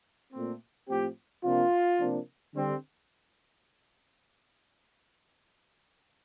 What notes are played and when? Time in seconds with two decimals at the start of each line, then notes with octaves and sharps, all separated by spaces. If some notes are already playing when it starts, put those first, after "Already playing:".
0.33 A#2 A3 C4
0.88 A2 F3 C4 G4
1.44 C3 F3 A#3 D4 F4
1.99 C3 F3 A#3 D4
2.55 D3 G3 C4